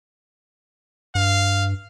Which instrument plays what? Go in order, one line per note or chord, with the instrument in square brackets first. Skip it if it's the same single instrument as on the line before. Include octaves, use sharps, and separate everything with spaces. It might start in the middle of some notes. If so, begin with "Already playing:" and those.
[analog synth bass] G2 [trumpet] F5